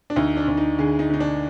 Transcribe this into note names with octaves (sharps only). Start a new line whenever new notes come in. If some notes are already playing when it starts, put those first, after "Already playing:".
D4
D2 D#4
D4
D2
D#4
D3 G#4
D#4
D3 D#4
D4